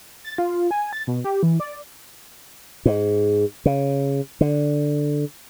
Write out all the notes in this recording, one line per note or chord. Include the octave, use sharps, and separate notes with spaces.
A6
F4
G#5
A6
B2
G4
E3
D5
G#2
C#3
D3